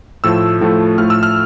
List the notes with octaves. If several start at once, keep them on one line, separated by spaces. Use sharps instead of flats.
A2 F3 A3 E6
A2 F3 A3
A2 F3 A3 F6
E6
F6